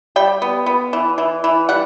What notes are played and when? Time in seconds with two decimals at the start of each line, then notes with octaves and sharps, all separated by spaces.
0.16 G3 G5
0.42 B3
0.66 B3
0.93 E3
1.18 E3
1.44 E3
1.69 G3 F#5